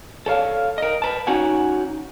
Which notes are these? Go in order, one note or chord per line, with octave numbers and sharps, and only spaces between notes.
A4 C#5 F5
A#4 D#5
B4 A5
C#4 D#4 F#4 F#5 G#5